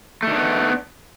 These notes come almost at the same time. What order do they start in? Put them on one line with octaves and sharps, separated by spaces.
A3 D#3 D4 B3